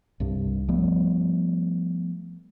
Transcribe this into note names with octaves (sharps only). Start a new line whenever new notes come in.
C2 G2
F3 G3 A3 B3